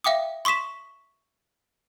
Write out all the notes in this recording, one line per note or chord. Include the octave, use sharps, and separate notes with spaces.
E5 F5 G5 D6 D#6
C6 C#6 D#6 B6 E7